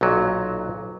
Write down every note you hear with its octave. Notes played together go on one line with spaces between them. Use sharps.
B1 A#2 F#3